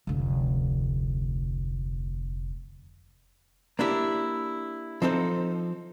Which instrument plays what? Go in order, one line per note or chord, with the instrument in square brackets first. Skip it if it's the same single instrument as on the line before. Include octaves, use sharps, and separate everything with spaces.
[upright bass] F1 D2
[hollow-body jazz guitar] A#3 D4 E4 G4
F3 C4 D#4 A4 C5